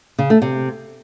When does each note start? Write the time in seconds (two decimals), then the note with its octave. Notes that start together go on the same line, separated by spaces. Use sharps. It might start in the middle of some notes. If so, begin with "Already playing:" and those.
0.19 C#3
0.30 A3
0.42 C3